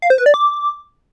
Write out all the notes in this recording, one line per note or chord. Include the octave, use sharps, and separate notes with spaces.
F5
C5
B4
D5
D6